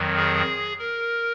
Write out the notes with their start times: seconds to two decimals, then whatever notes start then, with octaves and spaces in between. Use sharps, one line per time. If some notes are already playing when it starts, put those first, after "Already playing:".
Already playing: F2 D#3 F#3
0.16 G#4
0.79 A#4